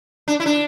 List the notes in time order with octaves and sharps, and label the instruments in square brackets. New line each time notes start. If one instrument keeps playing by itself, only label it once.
[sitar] D4
E4
D4